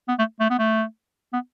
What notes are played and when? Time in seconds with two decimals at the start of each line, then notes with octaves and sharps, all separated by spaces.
0.08 B3
0.19 A3
0.40 A3
0.50 B3
0.59 A3
1.33 B3